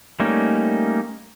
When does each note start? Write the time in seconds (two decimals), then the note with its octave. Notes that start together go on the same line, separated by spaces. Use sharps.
0.20 G3 A3 A#3 C#4 D#4